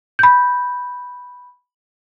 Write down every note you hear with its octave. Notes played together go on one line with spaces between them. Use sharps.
B5 G6